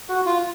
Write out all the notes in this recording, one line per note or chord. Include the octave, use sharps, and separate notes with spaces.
F#4
F4